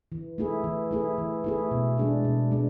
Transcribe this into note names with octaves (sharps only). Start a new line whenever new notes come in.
E3
A3 E4 G#4
E3
A3 E4 G#4
E3
A3 E4 G#4
B2
G#3 D4 G#4
B2
G#3 D4